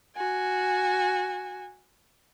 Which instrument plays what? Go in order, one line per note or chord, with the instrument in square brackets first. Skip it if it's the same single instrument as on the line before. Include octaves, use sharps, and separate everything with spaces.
[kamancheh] F#4 G#5